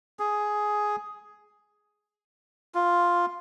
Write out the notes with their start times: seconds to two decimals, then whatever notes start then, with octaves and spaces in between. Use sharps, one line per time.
0.19 G#4
2.75 F4